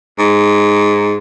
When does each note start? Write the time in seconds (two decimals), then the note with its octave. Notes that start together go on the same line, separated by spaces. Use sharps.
0.19 G#2